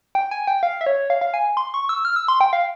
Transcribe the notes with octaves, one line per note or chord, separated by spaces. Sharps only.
G5
G#5
G5
F5
E5
C#5
F5
F5
G#5
C6
C#6
E6
F6
E6
C6
G5
F5